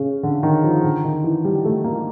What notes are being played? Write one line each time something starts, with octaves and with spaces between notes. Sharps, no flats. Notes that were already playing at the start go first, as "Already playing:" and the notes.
Already playing: C#3
D3
D#3
F3
D3
D#3
E3
G3
A3
A#3